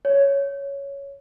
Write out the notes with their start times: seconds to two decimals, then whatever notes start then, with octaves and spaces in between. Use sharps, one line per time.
0.05 C#5